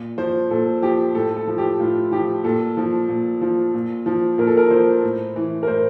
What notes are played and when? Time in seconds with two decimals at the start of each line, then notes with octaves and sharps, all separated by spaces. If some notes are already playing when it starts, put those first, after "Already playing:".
Already playing: A#2
0.18 F3 C5
0.50 A#2 A4
0.82 F3 G4
1.15 A2 A4
1.36 A4
1.47 F3
1.58 G4
1.79 A2 F4
2.11 F3 G4
2.44 A#2 A4
2.77 F3
3.08 A#2
3.41 F3
3.74 A#2
4.06 F3
4.38 A#2 A#4
4.47 A4
4.57 A#4
4.70 F3 C5
5.03 A2
5.36 E3
5.63 A#4
5.67 A2 C5